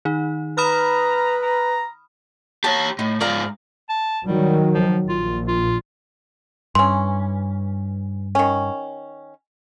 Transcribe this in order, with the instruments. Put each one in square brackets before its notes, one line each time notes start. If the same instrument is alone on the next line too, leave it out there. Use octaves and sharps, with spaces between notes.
[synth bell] D#3 D#4
[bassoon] B4 [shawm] A#5 [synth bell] B5 D#6 F6
[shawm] A#5
[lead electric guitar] G4 C#5 [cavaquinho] A5 A#5
[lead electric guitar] A2 [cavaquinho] D#4
[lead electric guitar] G#2 F4 [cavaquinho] D5 F5 A#5
[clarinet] A5
[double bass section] D#3 F#3 [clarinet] G3
[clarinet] F3
[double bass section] A#1 [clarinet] F4
[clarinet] F4
[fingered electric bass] G2 [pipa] E3 C#4 [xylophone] C6
[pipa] D#3 C#4